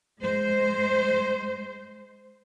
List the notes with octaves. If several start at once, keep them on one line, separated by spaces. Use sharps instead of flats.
G#3 C5